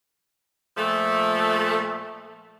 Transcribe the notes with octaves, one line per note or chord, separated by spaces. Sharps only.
A#2 F3 A3